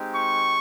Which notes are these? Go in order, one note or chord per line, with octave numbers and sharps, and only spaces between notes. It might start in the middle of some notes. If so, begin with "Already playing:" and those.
Already playing: G#3 C4 D#4 G4
C#6